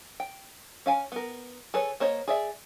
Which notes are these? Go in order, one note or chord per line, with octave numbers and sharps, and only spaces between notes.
G5
C#4 F5 G#5
B3 A#4
G#4 A4 B4 C#5
A#3 C5 C#5 D#5
G#4 D5 E5